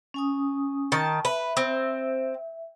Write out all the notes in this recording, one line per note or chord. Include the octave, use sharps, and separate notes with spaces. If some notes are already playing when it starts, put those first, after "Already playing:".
C#4 G#5 D#6
D#3 G5 A5
B4 E5
C4